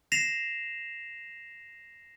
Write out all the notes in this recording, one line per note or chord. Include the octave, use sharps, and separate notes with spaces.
A#6 C7 E7 F7